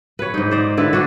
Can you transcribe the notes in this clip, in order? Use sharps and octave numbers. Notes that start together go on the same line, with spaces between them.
B4 C#5
G#2 D#4
C5 D5 D#5
D3 E4 B4
D4 F#4